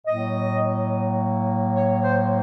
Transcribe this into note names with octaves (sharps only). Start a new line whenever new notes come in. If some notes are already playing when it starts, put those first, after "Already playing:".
A2 F#3 A#3 D#5
C#5
C5